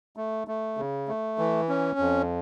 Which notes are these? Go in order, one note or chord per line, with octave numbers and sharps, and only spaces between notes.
A3
A3
C#3
A3
E3
C#4
F2